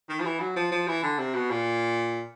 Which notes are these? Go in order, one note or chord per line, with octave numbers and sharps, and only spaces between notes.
D#3
F3
E3
F#3
F3
F3
E3
D3
C3
B2
A#2